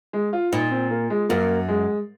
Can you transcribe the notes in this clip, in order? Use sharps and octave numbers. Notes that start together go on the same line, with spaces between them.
G#3
F4
A#2 D#4
C4
A#3
G#3
F#2 A#3
G#3